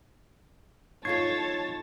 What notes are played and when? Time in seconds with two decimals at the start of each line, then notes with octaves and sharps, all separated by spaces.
1.05 D#4 F4 A4 C#5 A5 C#6 G#6 C7